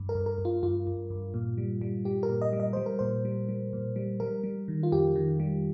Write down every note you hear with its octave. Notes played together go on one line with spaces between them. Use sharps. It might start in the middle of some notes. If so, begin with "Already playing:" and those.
Already playing: G2
A#4
G2
A#4
G2
F4
G2 F4
G2
G2
A#2
G3
G3
G3 G4
A#4
A#2
D#5
G3
D#5
G3 C5
A#4
A#2 C5
G3
G3
A#2
G3
G3 A#4
G3
D#3
F4
F2 G4
D#3
G3